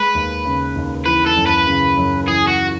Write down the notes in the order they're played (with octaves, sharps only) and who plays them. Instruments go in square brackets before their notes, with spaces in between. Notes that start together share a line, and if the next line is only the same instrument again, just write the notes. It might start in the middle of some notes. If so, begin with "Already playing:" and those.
Already playing: [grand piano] G#3 [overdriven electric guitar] B4
[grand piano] D#2
C#3
D#2
[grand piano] E3 [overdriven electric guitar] B4
[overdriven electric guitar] A4
[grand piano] F#2
[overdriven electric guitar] B4
[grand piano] C#3
F#2
[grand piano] E3 [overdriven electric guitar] G#4
[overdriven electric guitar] F#4